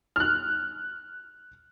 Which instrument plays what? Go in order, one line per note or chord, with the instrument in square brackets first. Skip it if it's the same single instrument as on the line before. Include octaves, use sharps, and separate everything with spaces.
[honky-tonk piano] F6 F#6